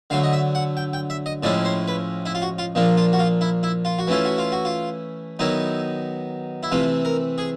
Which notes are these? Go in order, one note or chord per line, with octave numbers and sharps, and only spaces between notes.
D3 F#3 A3 F5
D#5
E5
F#5
G5
G5
E5
D#5
A2 F3 G#3 C#4 E4 D5
C5
B4
E4
F4
F#4
F4
A#2 F3 A#3 D4
F4
F#4
F4
E4
E4
F4
F#4
E3 A3 C#4 E4 F4
F#4
F4
F#4
F4
D#3 F#3 B3 D#4 E4
E4
C3 E3 A3 F4
A#4
G#4